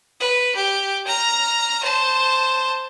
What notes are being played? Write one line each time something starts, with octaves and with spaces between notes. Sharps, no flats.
B4
G4
A#5 F6
C5 A5